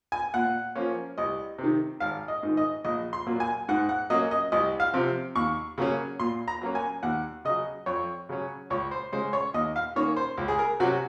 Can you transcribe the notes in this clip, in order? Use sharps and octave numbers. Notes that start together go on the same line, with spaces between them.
G#5
A#2 F#5
F3 A#3 C#4
C2 D#5
C3 D#3
G#1 F5
D#5
G#2 D#3
D#5
A#1 D#5
C6
A#2 F#3 A#3
G#5
G#2 F#5
F#5
F#3 A#3 C#4 D#5
D#5
C2 D#5
F5
C3 F3 C4
D#2 C#6
C#3 F#3 A#3 C#4
A#2 C6
A#5
F#3 A#3 C#4
G#5
D#2 F#5
C#3 F#3 D#5
F2 C#5
C#3 F#3 C#4
C#2 C#5
C5
C#3 G#3 C#4 C5
C#5
D#2 D#5
F5
D#3 A#3 C#4 C#5
C5
C#2
G#4
A#4
C3 F#3 C#4 F#4